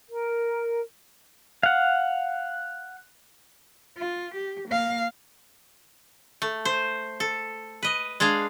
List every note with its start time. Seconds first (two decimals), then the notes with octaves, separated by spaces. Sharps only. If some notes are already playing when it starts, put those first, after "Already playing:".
0.10 A#4
1.63 F5 F#5
3.98 F4
4.35 G4
4.69 A#3 F5
6.42 A3
6.65 C5
7.20 A4
7.83 B4 D#5
8.20 G#3 D4 G#4 F5